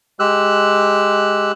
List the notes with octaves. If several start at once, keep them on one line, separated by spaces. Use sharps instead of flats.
G#3 G4 E6 F#6